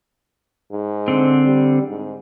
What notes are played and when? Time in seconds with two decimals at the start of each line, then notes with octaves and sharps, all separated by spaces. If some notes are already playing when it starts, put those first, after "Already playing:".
0.71 G#2
1.08 D3 C4
1.44 G3
1.88 G#2